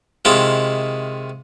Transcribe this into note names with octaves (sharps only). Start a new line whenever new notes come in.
C3 D#3 G#3 E4 F4